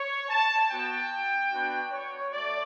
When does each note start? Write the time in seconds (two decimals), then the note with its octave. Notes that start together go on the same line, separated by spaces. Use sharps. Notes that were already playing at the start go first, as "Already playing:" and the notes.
Already playing: C#5
0.29 A5
0.70 B3 F#4 G5
1.52 B3 D4 F#4
1.92 C#5
2.33 A3 D5